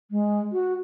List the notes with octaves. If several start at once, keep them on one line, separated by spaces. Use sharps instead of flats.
G#3
F#4